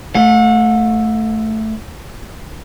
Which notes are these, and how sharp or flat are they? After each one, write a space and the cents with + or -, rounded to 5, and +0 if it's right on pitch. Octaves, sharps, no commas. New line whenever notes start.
A3 +0 F#5 -45